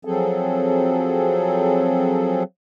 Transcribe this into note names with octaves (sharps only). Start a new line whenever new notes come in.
F3 F#3 C4 G#4 A4